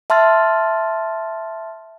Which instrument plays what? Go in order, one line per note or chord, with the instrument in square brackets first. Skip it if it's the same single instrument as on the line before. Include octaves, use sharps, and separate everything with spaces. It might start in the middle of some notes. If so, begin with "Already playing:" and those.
[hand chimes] E5 A5 C6 F6 A6